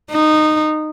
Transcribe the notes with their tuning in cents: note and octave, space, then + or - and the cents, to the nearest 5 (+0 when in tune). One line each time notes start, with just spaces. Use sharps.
D#4 -15